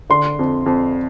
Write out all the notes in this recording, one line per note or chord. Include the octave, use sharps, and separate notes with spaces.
D3 C6
F2
F2